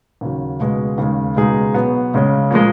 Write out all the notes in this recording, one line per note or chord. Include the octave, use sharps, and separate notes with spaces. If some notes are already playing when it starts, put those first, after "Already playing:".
D#2 C#3 F#3
C#2 B2 G#3
D#2 C#3 G#3
C#2 B2 G#3 D#4 G#4
B2 F#3 B3
C#2 C#3 G#3 C#4
A#2 F3 G#3